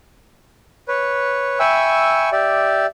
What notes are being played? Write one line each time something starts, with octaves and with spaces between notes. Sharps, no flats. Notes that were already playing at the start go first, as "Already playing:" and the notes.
B4 C#5
E5 G5 G#5 B5 C#6 E6
G4 D5 E5